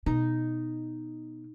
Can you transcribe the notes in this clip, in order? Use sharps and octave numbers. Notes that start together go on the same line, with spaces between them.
B2 D#4